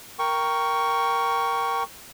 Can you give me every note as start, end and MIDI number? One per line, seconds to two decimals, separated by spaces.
0.19 1.83 70
0.19 1.83 79
0.19 1.83 85